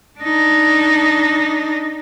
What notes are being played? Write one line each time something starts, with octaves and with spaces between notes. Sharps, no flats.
D4 D#4